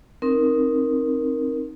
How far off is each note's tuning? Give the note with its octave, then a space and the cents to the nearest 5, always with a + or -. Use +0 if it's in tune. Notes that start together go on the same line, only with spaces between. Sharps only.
C4 +20 D#4 +0 A#4 +0